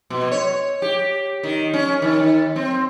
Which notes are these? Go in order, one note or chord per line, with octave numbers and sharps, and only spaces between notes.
B2
C#5
G4
D#3
C#4
D#3
C4